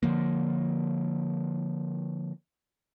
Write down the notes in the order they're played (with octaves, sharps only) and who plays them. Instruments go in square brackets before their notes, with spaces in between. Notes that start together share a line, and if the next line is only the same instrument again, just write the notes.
[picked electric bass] D3 F3 A#3